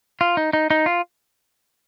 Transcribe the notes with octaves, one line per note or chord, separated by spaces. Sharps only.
F4
D#4
D#4
D#4
F4